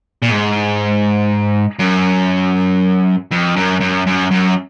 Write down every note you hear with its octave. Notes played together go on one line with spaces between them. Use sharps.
A#2
G#2
F#2
F2
F#2
F#2
F#2
F#2